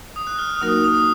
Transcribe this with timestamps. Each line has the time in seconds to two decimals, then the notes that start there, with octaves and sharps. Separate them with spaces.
0.16 D#6
0.27 F#6
0.39 F6
0.50 D#6
0.61 F#3 A#3 D#4 F#4 A#4 D#6
0.84 D#6